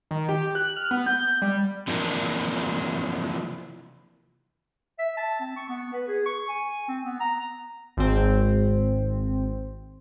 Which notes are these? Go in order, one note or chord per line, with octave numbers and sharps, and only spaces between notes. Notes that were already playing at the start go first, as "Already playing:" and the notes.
D#3
G4
F#6
F6
B3
G6
G3
C3 E3 F3 A#3 D4
E5
A5
C4
C#6
B3
B4
G#4
C#6
G#5
C4
B3
A#5
G#1 C4